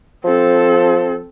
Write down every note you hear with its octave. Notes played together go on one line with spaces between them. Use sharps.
F3 C4 A4